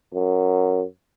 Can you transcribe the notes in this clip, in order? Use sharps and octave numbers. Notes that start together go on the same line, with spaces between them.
F#2